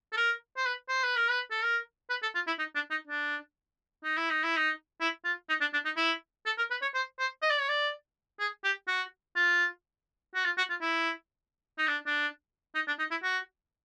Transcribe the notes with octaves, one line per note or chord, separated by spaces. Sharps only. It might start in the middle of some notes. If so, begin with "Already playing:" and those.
A4
A#4
C5
B4
C5
B4
A#4
B4
A4
A#4
B4
A4
F4
E4
D#4
D4
D#4
D4
D#4
E4
D#4
E4
D#4
E4
F4
D#4
D4
D4
D#4
E4
A4
A#4
B4
C#5
C5
C5
D#5
D5
C#5
D5
G#4
G4
F#4
F4
F#4
F4
F#4
F4
E4
D#4
D4
D4
D#4
D4
D#4
E4
F#4